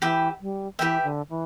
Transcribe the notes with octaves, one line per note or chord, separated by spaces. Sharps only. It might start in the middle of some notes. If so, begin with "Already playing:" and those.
E3 G4 B4 E5 G5
G3
E3 G4 B4 E5 G5
D3
E3